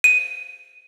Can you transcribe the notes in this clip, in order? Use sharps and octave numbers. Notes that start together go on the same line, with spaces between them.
D#7